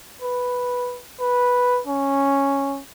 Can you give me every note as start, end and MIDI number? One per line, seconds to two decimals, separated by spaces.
0.22 1.00 71
1.20 1.80 71
1.87 2.81 61